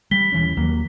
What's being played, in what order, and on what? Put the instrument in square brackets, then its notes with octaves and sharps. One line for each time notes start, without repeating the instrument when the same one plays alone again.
[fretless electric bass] G3 [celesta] B6 G7
[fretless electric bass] D#1 E3 C#4
D#2 F#3 A#3